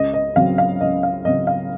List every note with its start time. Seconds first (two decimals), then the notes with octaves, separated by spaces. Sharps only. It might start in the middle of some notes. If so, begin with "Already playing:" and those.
Already playing: C#2 D#5
0.14 D#5
0.36 C#3 F#3 C4 F5
0.58 F5
0.81 C#2 D#5
1.03 F5
1.25 C#3 F#3 C4 D#5
1.47 F5